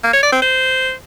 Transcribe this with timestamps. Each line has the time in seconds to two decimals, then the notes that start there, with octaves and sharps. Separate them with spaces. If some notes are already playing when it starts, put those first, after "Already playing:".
0.04 A#3
0.13 C#5
0.23 D5
0.33 C4
0.42 C5